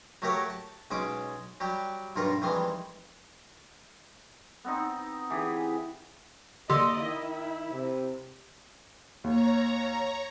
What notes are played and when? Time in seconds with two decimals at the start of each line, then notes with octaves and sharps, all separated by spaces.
0.22 F#3 A3 G4 A#4 C#5 F#5
0.50 A5
0.91 B1 G#3 C#4 G#4 D6
1.60 F#3 G3 G4
2.16 B1 G2 F4 A#4 C#6
2.42 F2 D#3 E3 G3 G#3 C6
4.64 B3 C4 D#4
5.30 E3 G4 G#4
6.70 D3 A#3 G4 D5 D#5 C6 E6
7.01 D#3 E4
7.71 C3
9.24 D#2 C#5 A#5